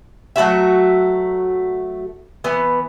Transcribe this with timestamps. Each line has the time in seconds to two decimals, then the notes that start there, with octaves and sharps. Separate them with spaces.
0.36 F#3 A3 F#4 E5
2.44 E3 B3